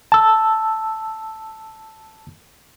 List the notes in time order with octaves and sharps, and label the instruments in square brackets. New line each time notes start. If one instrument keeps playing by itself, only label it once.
[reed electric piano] A5 E6